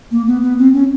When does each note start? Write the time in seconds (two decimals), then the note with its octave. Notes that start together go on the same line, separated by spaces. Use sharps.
0.11 A#3
0.27 B3
0.43 B3
0.59 C4
0.73 C#4